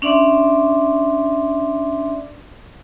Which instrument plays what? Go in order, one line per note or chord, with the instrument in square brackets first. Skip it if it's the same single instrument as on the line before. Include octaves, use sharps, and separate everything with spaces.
[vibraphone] C#4 D4 D5 E5 C6 D6